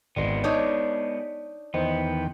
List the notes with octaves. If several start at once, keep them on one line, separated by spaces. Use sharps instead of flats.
G#1 G#3 B3 D5 C6
D4 D#4 C#5 G6
E2 D#3 B3 C5 D#5 G5